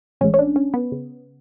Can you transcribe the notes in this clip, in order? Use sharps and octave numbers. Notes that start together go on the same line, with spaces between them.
A#1 A2 E3 G#3 C#4
C#4
D4
C#4
B3
C#3